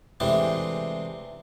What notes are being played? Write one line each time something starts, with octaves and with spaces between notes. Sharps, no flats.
C3 E3 G#3 A3 D4 G4